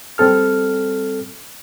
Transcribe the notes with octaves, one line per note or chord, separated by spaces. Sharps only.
G3 C4 A4 F6